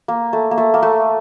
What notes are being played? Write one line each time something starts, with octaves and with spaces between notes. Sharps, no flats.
A#3
A3
A#3
A3
A#3
A3